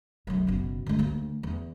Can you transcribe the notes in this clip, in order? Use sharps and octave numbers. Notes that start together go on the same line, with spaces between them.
B1 F#2
F#1 B2
D3 G#3
D2 A#3
E2